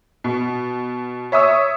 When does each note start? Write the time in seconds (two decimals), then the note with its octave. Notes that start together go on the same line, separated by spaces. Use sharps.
0.24 B2
1.32 C#5 E5 C#6 D#6 E6